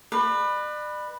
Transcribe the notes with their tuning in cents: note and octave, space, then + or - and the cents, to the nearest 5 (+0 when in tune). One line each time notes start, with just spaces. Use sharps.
B4 +0 D5 +40